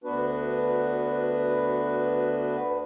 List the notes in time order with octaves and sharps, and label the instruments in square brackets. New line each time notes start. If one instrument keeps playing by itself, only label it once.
[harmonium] D2 B3 D4 F#4 B4